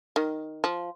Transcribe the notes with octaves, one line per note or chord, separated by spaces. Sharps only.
D#3
F3